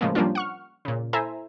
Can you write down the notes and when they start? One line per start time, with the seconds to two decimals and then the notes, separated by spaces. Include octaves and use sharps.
0.01 A2 C#3 F3 G#3 A#3
0.15 F3 G3 A#3 C#4 D4 F4
0.35 F#5 C#6 F6
0.85 A#2 C#3
1.13 E4 A4 C5 E5 G#5 A#5